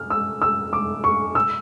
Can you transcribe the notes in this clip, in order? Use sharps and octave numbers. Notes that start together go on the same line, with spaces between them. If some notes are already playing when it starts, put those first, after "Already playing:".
Already playing: F6
E6
E6
D6
C#6
E6